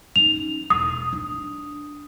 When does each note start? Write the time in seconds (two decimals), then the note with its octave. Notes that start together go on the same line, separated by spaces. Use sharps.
0.16 C#4 D#4 F7
0.70 E1 D#6
1.12 D4